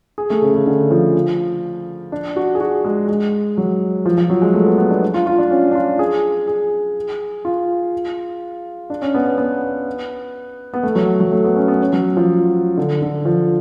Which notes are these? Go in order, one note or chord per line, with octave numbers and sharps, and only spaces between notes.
G#4
A3
C#3
C#3
D3
F3
D4
F#4
G#4
F#4
G#3
G#3
F#3
F3
F3
F#3
G#3
A3
B3
B3
D4
D4
F4
F4
D4
C#4
D4
F4
G#4
G#4
F4
D4
C#4
B3
B3
B3
B3
A3
F#3
F#3
A3
B3
C#4
B3
C#4
F#3
F3
D3
D3
F3